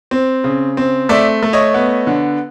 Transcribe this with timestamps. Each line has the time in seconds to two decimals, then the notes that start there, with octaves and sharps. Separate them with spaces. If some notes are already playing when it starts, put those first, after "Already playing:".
0.11 C4
0.44 C#3
0.77 C4
1.09 A3 D5 E5
1.43 A3
1.53 C#5 D#5
1.74 B3
2.07 D3